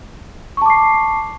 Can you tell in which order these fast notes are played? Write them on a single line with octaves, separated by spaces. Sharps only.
C#6 A5 D6 C7